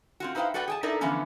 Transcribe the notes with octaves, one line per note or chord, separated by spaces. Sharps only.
C4 F4 F#4
D#4 E4 B4 C5 F5 G5
F#4 A4 B4 D5 F#5 G5
G#4 G5 A5
D#4 E4 A4 A#4 D5
D3 E3 F3 A3 B3 C#4